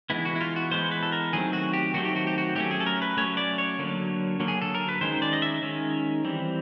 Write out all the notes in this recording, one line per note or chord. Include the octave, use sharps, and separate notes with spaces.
E3 G#3 B3 E4
F#4
E4
F4
F#4
E3 G#3 B3 C5
B4
A4
A#4
D#3 F#3 A3 C4 G#4
F#4
G4
D#3 F#3 A3 C4 F#4
G4
F#4
G4
F#4
F#3 A3 C#4 G4
G#4
A4
A#4
B4
F#3 A3 C#4 C#5
D5
C#5
D3 F#3 A#3
D3 F#3 A#3
G#4
A4
A#4
B4
D#3 G#3 C#4 C5
D5
D#5
E5
D#3 G#3 C#4
E3 G3 C4